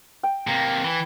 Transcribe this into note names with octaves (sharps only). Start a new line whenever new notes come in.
G5
C3 A#3
E3